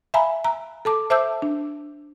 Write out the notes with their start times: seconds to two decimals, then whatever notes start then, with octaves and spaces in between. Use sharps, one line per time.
0.14 E5 F5 G#5 A#5 B5
0.44 A#5
0.85 A4 A5 D6
1.10 C5 E5 A5 D6 E6 G6
1.42 D4